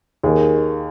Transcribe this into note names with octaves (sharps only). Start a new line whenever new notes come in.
D#2 D#3 G#4